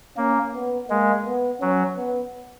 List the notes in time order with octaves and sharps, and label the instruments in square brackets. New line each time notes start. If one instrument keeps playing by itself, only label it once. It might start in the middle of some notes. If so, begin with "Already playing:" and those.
[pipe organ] A#3 [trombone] C#4
[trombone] B3
[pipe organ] G#3 [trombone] A#3
[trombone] B3
[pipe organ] F#3 [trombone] C#4
[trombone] B3